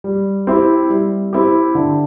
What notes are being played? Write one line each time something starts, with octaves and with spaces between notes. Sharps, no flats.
G3
C4 E4 G4
G3
C4 E4 G4
D3